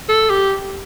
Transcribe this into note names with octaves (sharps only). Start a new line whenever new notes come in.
A4
G4